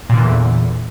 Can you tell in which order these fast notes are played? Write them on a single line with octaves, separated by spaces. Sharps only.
A#2 D3 E3 E2